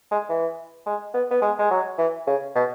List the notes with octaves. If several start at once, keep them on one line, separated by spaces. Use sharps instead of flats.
G#3
E3
G#3
B3
B3
G#3
G#3
F#3
E3
C#3
B2